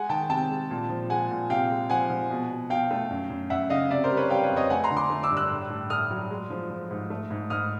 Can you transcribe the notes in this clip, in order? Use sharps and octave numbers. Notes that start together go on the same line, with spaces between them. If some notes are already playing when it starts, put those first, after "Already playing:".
Already playing: G#3 F#5 G#5
D#3 G5 A5
C3 G5 A5
G#3
A#2
F3
G#3 F#5 G#5
A#2
C3 F5 G5
G#3
F3 F#5 G#5
F3
B2
B2
B2 F5 G5
A3
F#2
F#2
F#2 E5 F#5
C#3 D#5 F5
C3 D5 E5
A#4 C5
G3
B4 C#5
G3 F5 G5
B4 C#5
F2
C#5 D#5
A3 F#5 G#5
A#5 C6
D3
C6 D6
A3
D6 E6
G2
E6 F#6
A2
A2
A3 D#6 F6
F#3
G#3
F3
F3
G#2
A3
G#2
G#2 D#6 F6